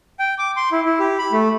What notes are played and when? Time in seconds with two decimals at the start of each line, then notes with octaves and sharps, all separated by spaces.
0.19 G5
0.38 D6
0.57 C6
0.72 E4
0.85 E4
0.99 G4
1.19 B5
1.32 A3